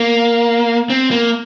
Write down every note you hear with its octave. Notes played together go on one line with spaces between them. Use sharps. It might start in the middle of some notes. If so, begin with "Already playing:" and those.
Already playing: A#3
C4
A#3